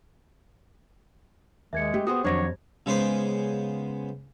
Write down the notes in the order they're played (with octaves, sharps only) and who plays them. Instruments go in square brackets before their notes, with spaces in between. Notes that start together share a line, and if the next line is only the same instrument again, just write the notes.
[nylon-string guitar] D#2 [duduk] G#3 [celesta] E5 G#6 C#7
[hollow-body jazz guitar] A3 [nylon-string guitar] G4
[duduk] B3 [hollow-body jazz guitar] F#4 G#4 C5 [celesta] D#6
[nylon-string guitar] F2 [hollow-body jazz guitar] D#3 F#3 D4 [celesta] C5 G#6 A#6 [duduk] C#5
[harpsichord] C#3 G#3 B3 C5 D6 D#6